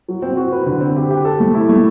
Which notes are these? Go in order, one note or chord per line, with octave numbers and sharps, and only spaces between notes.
F#3
C4
F#4
B4
D3
C4
G4
G4
A4
A3
E4
A3